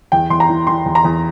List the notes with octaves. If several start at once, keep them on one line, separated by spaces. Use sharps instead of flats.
E2 G5
E2 C6
A#5
E3
E3 C6
E2
A#5
E2